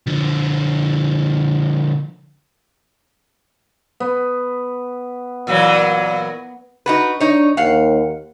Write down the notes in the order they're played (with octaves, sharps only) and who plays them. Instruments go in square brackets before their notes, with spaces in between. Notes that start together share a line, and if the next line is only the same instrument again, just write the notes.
[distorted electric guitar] D3 F3
[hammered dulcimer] B3
[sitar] A#2 E3 F#3
[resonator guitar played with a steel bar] D#4 F#4 B4
[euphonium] D4 [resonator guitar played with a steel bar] D#4 C#5
[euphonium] D#2 [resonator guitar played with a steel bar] F5 F#5